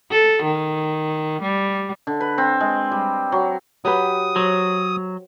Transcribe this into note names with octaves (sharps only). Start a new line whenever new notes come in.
A4
D#3
G3
D3
B4
C4
G#3
G3
F#3
F#3 G4 B4 D#6
F#3 C5 C#5